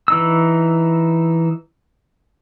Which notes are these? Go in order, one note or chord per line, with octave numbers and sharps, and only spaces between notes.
E3 D#4 E6